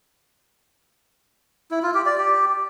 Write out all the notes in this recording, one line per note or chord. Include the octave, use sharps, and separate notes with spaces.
E4
F4
G4
D5
G4